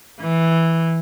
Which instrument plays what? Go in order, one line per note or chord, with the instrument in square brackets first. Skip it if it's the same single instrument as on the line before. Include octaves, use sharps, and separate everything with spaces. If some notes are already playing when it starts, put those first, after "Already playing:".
[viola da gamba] E3